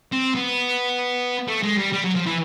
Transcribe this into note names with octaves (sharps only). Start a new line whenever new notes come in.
C4
B3
A3
G#3
G3
G3
F#3
F3
E3